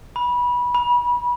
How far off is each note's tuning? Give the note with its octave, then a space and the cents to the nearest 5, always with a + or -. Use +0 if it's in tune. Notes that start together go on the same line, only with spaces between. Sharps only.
B5 -20
B5 -30